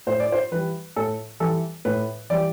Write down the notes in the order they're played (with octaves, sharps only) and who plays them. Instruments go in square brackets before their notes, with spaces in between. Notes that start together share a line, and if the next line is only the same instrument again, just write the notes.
[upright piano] A2 C5
D5
C5
E3 G3 B4
A2 A4
E3 G3 A4
A2 B4
E3 G3 D5